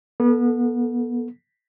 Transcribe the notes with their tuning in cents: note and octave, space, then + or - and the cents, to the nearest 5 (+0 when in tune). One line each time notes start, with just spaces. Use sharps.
B3 -30 A4 +0